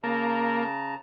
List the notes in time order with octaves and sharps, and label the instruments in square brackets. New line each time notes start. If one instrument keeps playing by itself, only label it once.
[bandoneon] C#3 A5 A#5 [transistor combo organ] A#3